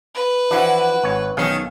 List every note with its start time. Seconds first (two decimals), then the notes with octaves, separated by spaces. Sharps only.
0.15 B4
0.51 E3 F3 D4 E4 F#4
1.04 G#1 C#5 F#5
1.37 B1 D#3 C#4 G#4 F5